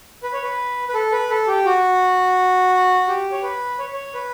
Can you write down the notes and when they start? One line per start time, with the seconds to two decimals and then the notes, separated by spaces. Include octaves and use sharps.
0.23 B4
0.33 C#5
0.43 B4
0.89 B4
0.94 A4
1.12 B4
1.30 A4
1.47 G4
1.65 F#4
3.08 G4
3.32 C#5
3.43 B4
3.79 C#5
3.93 C#5
4.14 B4